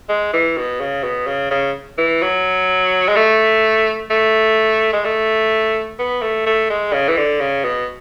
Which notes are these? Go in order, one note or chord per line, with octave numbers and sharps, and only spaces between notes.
G#3
E3
B2
C#3
B2
C#3
C#3
E3
F#3
G#3
A3
A3
G#3
A3
B3
A3
A3
G#3
C#3
E3
D3
C#3
B2